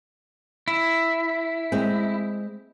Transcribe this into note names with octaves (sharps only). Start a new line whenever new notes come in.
E4
G#3 C4